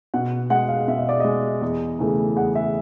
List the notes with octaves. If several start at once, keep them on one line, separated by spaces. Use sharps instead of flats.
B2 F#5
G#3 F#5
F5
B2 E5
D#5
D5
G#3 D#5
E2
C#3 E3 A3
E2 F#5
E5